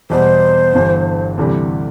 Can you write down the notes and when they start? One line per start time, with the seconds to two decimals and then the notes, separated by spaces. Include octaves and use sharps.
0.10 E2 B2 G3 C5
0.74 G1 G2 E3
1.37 D2 C3 E3 G3